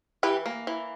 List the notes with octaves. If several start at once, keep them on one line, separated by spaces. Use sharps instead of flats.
E3 G4 B4
A#3
E3